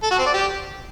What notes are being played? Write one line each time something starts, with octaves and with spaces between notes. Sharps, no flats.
A4
F#4
C4
D5
G4